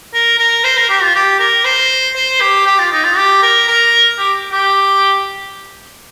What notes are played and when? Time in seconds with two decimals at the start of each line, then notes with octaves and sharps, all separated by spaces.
0.14 A#4
0.39 A#4
0.64 C5
0.77 A#4
0.89 G4
1.02 F4
1.15 G4
1.40 A#4
1.65 C5
2.16 C5
2.41 G4
2.66 G4
2.79 F4
2.92 D#4
3.04 F4
3.17 G4
3.43 A#4
3.68 A#4
4.19 G4
4.52 G4